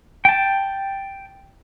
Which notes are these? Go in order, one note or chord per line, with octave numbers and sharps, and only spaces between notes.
G5 A5